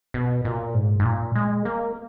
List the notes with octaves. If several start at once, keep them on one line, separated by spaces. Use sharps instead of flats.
B2
A#2
G#2
G#2
A#2
G#3
A#3